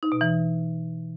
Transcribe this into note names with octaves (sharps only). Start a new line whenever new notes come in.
D#4
B2
E3